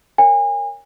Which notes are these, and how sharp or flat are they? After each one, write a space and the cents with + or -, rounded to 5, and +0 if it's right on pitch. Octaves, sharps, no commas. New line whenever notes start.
A#4 +0 C#5 +0 G#5 -35